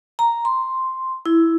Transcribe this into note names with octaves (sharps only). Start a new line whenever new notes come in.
A#5
C6
E4